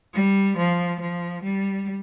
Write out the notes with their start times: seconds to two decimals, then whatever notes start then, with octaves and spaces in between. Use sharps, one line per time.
0.14 G3
0.57 F3
1.00 F3
1.43 G3